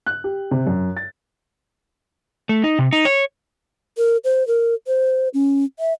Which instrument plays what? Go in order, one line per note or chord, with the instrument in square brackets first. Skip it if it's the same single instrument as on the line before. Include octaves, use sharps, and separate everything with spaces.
[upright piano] F#6
G4
C3
F#2
A6
[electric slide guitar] A3
D#4
C3
D#4
C#5
[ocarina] A#4
C5
A#4
C5
C#4
E5